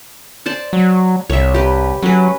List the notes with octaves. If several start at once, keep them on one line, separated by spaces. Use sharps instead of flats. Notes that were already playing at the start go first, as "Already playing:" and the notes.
C5 D5 A5
F#3
C2 C#5 E5
G4 B4
F#3 C#4 B4